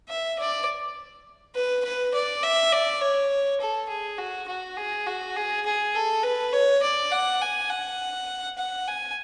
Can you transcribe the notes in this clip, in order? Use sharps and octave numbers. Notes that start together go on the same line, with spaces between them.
E5
D5
B4
B4
D5
E5
D5
C#5
A4
G#4
F#4
F#4
G#4
F#4
G#4
G#4
A4
B4
C#5
D5
F#5
G#5
F#5
F#5
G#5